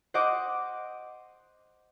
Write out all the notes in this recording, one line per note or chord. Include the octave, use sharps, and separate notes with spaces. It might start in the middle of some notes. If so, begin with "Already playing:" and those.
C5 D#5 F#5 D6